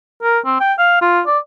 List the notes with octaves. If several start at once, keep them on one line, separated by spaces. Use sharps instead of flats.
A#4
C4
G5
F5
F4
D5